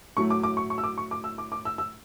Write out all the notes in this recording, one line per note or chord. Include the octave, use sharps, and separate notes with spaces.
A2 F#3 A3 C#6
D6
D6
C#6
C#6
E6
D6
C#6
D6
E6
D6
D6
E6
E6